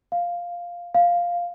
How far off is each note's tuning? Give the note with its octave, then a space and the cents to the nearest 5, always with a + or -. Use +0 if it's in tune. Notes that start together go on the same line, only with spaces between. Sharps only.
F5 +0
F5 +0